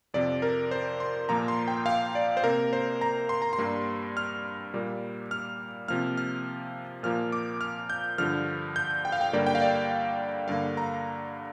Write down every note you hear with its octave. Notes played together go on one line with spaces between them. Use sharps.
F2 C3 F3 D5
A#4
C5
C6
A#2 F3 A#3 A#5
C6
G5
F5
D5
C5
C3 A#3 A#4
C5
A#5
C6
A#5
C6
G2 G3 A#3
F6
A#2 G3 A#3
F6
C3 F3 A#3 F6
F6
A#2 F3 A#3 F6
D6
F6
G6
G2 D3 F3 F6
G6
G5
F5
G5
G2 D3 G3 A#3 D5
G5
F5
D5
G2 D3 A#3 F5
A#5